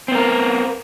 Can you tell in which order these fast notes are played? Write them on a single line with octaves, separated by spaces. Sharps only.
C4 B3 A#4